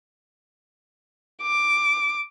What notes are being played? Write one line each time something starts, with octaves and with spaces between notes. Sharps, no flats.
D6